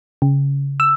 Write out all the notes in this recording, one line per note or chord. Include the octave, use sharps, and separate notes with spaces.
C#3
E6